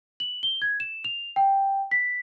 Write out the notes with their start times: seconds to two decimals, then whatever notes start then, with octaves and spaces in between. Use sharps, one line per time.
0.20 F#7
0.43 G7
0.62 G#6
0.80 E7
1.04 F7
1.36 G5
1.91 B6